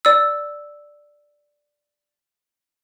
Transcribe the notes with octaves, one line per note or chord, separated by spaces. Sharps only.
D5 E6